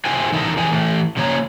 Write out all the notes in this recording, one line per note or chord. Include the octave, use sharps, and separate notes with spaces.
E4 F#4 A4 C5 G5 G#5
E3 D#4 E4 A4 A#4 A5
E3 F3 G#4 G5 G#5
E3 A3
C#3 F3 A#3 C#5 A#5